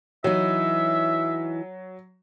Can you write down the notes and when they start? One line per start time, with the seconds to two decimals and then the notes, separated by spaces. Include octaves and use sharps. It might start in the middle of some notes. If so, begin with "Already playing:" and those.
0.24 E3 F#3 D#4 E5